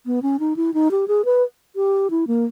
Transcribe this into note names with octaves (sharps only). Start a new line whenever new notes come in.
B3
C#4
D#4
E4
D#4
G4
G#4
B4
G4
E4
A#3